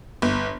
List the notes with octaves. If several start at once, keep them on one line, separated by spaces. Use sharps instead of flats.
G1